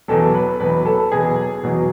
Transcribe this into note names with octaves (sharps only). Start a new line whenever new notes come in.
E2 B2 F#3 A4
B4
E2 B2 F#3 B4
A4
E2 B2 F#3 G#4
E2 B2 F#3